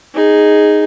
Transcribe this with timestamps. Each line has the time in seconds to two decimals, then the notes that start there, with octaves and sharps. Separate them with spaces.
0.14 D#4 G#4